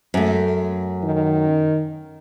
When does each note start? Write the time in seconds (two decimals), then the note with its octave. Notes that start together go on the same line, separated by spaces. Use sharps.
0.14 F#2 A3
1.04 D#3